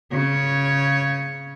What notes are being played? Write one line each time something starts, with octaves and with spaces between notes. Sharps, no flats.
C#3 C#5